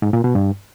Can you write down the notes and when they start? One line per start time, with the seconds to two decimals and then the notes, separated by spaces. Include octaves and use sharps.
0.02 G#2
0.13 A#2
0.24 B2
0.35 G2